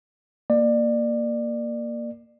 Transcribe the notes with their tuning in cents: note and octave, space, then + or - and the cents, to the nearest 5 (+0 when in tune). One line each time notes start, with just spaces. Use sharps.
A#3 +0 D5 +25